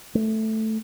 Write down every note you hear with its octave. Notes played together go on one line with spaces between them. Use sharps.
A3